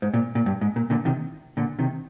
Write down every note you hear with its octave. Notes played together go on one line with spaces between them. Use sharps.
G#2
A#2
A#2
G2
G#2
A#2
A#2 D3
C3 D#3
A#2 D3
C3 D#3